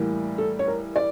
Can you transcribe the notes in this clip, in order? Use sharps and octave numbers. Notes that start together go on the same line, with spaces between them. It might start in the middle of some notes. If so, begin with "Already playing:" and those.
Already playing: A2 E3 G3 A#3
A4
C#5
A#4
D5